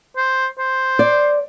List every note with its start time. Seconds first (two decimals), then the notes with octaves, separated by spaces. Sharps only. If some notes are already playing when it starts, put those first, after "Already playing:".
0.16 C5
0.59 C5
0.99 D5